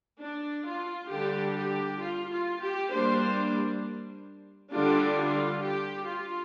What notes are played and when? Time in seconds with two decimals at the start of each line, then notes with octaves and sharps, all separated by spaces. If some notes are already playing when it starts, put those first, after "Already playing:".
0.19 D4
0.65 F4
1.10 D3 G3 D4 G4
1.55 G4
2.00 F4
2.31 F4
2.61 G4
2.90 G3 A#3 D4 C5
4.72 D3 G3 D4 F4
5.17 F4
5.63 G4
6.08 F4